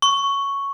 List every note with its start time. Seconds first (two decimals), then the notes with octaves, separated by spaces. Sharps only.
0.02 C#6